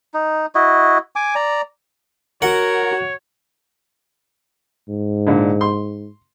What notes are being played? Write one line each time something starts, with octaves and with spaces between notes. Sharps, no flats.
D#4
E4 F#4 D#5
G#5 D6
D5 A#5
F#4 A#4 C#5 F#5
G#2
A#2 D3
C6